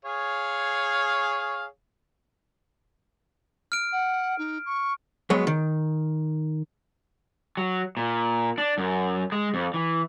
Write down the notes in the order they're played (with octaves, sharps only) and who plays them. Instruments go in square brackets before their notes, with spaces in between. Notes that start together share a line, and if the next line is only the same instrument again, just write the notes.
[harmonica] G#4 C#5 F5
[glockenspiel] F6 D7
[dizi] F#5
D#4
C#6
[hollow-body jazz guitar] F#3 G#3 B3 C#5
D#3
[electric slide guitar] F#3
A#2
D4
F#2
G#3
F2
E3